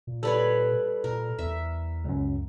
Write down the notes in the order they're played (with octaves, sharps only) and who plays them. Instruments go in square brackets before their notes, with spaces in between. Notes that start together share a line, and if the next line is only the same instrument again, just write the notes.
[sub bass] A#2
[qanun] G3 B4 C#5 [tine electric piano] A4
[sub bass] A#2 [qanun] A#4
[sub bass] E2 [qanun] E5
[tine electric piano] C#2 F#2